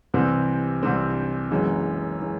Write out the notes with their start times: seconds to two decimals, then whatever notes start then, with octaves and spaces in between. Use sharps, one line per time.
0.14 C2 C3 E3 C4
0.83 C2 C3 E3 C4
1.51 F#1 F#2 E3 G#3
2.22 E3 G#3